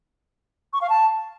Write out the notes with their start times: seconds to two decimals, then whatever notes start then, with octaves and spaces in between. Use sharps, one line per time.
0.73 C#6
0.81 F5
0.90 A5